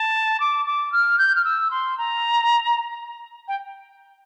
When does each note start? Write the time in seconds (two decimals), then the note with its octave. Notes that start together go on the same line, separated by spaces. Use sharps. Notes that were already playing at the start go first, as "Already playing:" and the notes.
Already playing: A5
0.40 D6
0.66 D6
0.92 F6
1.18 G6
1.35 F6
1.45 E6
1.71 C6
1.98 A#5
3.48 G5